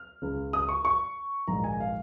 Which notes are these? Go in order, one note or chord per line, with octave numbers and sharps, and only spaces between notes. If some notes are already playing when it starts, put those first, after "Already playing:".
Already playing: F6
C#2 C#3
D#6
C#6
C#6
A#1 G#2 D#3 A#5
G#5
F5